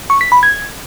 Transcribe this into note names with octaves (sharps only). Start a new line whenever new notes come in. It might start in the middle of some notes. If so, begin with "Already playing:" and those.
C#6
B6
B5
G#6